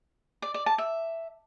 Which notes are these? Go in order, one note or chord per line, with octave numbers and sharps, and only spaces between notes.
D5
D5
A5
E5